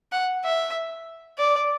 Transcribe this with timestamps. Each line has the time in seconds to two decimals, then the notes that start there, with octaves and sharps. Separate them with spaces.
0.12 F#5
0.44 E5
1.39 D5